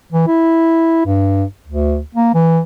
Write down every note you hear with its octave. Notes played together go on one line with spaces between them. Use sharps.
E3
E4
G2
D2
A#3
E3